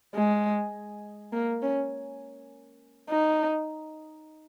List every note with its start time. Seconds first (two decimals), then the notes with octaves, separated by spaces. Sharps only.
0.15 G#3
1.32 A#3
1.62 C#4
3.10 D#4